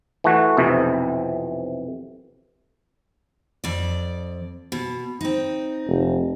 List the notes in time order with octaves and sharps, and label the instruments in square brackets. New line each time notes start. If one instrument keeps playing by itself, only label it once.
[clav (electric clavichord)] E3 A3 F#4
B1 F2 C3 E3
[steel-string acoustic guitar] F2 D5
B2
C4 D#4
[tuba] F1